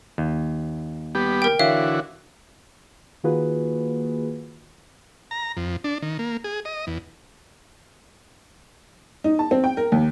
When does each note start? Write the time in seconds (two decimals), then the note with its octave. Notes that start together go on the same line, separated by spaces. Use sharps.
0.18 D#2
1.15 G3 B3 G4
1.42 A#4 G5
1.59 D3 E3 F#4 C#5 E5 F5
3.24 D#3 A#3 F4 F#4 G#4 B4
5.31 A#5
5.57 F2
5.84 D4
6.02 D#3
6.19 A#3
6.44 G#4
6.65 D#5
6.87 E2
9.24 D#4
9.39 A5
9.51 C4
9.64 G5
9.77 A#4
9.92 D#2